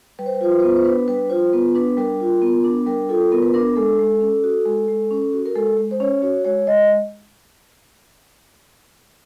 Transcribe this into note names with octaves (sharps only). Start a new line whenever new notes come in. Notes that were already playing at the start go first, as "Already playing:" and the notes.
G3 B4
C5
B4
F4 C5
B4
C5
B3
B4
C5
D4 B4
G3 B4
F4 C5
B3 B4
D4 B4
G3 A#4
F4
B3
D4
G3 A#4
F4 A4
B3 A#4
B4
D4 A#4
G#3 A4
G#3
C#4
F#4
G#3
G#3
C#4
F#4
A#4
G#3 A4
G#3
C5
C#4 C#5
F#4 C#5
G#3 C#5
G#3 D#5